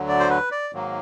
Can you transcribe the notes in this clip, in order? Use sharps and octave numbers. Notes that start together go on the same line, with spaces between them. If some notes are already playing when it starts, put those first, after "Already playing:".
Already playing: D2 D3 F#3
D5
C5
B4
D5
G#2 D#3 F#3 A#3